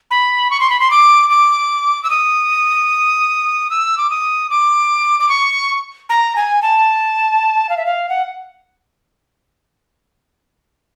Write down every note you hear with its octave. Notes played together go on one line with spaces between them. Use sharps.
B5
C#6
C6
B5
C6
D6
D6
E6
D#6
E6
D6
D#6
D6
D6
C#6
A#5
G#5
A5
F5
E5
F5
F#5